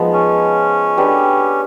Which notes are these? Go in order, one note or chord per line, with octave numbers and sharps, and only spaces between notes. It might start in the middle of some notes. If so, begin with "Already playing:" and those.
Already playing: F3 G#3 B3 D#4
C#4
A3 D4 G4 B4